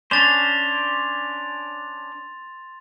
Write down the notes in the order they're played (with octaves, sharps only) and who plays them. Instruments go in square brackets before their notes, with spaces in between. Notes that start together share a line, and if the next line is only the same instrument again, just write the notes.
[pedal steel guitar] C#4 D4 C5 [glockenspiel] C6 A6 F7